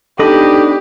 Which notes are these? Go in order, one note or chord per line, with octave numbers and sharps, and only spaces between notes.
F3 B3 D4 D#4 G4 A4 D#5 B5